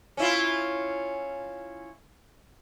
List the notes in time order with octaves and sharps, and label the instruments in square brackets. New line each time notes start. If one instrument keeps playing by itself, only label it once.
[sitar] C#4 E4 F4